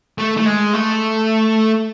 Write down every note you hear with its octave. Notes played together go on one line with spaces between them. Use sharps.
A3
A3
G#3
A3